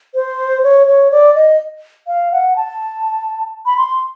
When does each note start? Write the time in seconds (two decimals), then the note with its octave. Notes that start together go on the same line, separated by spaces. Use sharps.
0.15 C5
0.64 C#5
0.87 C#5
1.12 D5
1.35 D#5
2.07 F5
2.32 F#5
2.56 A5
3.66 B5
3.77 C6